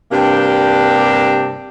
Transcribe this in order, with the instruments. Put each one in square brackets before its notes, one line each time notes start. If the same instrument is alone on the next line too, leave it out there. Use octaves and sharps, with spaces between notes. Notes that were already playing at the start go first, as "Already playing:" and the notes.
[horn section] G2 C3 A#3 D4 G4 G5